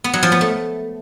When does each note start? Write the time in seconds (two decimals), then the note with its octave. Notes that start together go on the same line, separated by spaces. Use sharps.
0.04 B3
0.13 F#3
0.23 F3
0.32 B3
0.41 A3